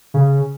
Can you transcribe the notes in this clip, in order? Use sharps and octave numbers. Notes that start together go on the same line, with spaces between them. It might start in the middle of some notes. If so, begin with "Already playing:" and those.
C#3